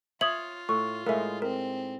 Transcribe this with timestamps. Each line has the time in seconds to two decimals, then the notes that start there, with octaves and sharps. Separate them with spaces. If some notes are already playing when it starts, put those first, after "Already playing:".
0.21 F4 C#5 E5 D#6 G#6 F#7
0.69 A2 C#6
1.06 A2 G#3 D#4 A#4 E5 F5
1.42 C4 A#4